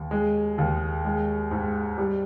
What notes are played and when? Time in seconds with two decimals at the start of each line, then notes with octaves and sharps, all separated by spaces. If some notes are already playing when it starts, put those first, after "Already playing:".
Already playing: D#2
0.11 G#3
0.58 D#2
1.05 G#3
1.51 G#2
1.98 G3